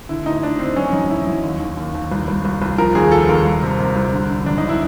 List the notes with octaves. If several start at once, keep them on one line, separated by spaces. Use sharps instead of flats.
D3 E4
D2 D#4
D2 D4
D2 C4
F#3 C#4
F#2 D#4
F#2 E4
F#3
D#2
D#2
D#2
D#2
C2
C2
C2
C2
F3 A#4
D#2 G#4
F3 A4
D#2 A#4
C2
C3
C3
C2
D3
D3
F#2 D4
D#4
E4